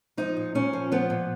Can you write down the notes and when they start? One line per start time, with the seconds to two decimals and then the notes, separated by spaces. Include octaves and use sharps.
0.17 F3 D#4
0.36 A#2
0.55 A#2 C#4
0.73 F3
0.92 F3 B3
1.10 A#2